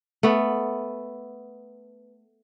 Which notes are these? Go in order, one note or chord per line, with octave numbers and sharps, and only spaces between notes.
A3 B3